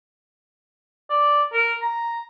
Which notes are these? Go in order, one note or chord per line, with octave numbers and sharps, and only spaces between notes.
D5
A#4
A#5